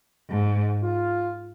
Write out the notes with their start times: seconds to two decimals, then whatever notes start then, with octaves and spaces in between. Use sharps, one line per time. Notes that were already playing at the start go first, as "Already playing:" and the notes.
0.30 G#2
0.83 F4